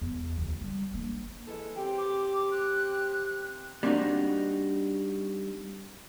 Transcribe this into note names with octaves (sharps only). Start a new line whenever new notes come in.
E2
D2
G3
A#3 D4
E3 G#3 A4
C4 G4 G5
D6
F#6
G3 A#3 C4 D4 D#4 F#4